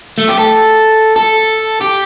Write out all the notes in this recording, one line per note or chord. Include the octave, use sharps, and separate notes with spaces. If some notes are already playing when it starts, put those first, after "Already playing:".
A3
G4
A4
A4
G4